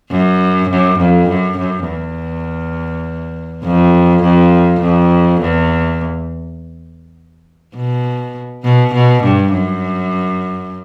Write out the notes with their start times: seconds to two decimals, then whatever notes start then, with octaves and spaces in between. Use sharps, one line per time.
0.11 F#2
0.69 F#2
0.99 F2
1.28 F#2
1.58 F#2
1.87 E2
3.64 F2
4.23 F2
4.81 F2
5.41 E2
7.76 B2
8.64 B2
8.94 B2
9.23 G2
9.52 F#2